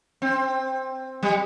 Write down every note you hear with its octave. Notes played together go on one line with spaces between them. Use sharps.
C4
G3